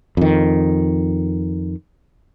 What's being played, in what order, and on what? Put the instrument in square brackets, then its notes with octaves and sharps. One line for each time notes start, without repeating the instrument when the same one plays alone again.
[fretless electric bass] F2 D#3